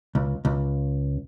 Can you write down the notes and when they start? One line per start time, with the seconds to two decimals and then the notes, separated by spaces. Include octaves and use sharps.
0.15 C#2
0.45 C#2